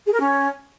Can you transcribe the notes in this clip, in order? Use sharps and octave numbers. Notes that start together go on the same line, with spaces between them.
G#4
A#4
C#4